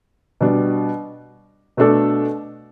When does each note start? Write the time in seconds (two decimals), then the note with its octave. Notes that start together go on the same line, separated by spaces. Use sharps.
0.41 B2 G3 D4
1.77 B2 A3 D4 A4